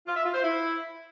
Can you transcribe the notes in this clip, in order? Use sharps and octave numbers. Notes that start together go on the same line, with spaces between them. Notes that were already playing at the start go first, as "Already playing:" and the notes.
F4
E5
F4
C5
E4